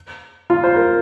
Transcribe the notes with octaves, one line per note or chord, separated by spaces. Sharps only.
F4
C5
A#4